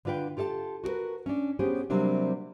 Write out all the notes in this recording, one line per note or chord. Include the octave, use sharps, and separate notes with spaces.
D3 D4 F4 B4 G5
F4 G4 A4 E5 A5
F#4 G4 A#4 B4
C#4 D4
B3 C#4 G4 G#4 C5
C3 F#3 G3 A#3 C4 D4